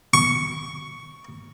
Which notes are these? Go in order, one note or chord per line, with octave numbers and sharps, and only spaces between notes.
C#6